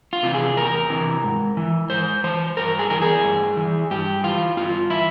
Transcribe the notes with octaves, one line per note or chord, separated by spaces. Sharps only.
F4
C3 E3
G#4
E2 A#4
C3 E3
G#2
E3
G#2 C5
E3 C5
G2 A#4
G#4
E3 A#4
G#4
G2
E3
G2 G4
E3 F4
G2 F4
E3 E4